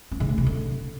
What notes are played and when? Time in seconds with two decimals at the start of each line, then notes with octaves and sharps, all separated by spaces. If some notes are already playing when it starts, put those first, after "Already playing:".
0.11 C#4
0.20 C#3
0.29 A3
0.38 C3
0.46 D3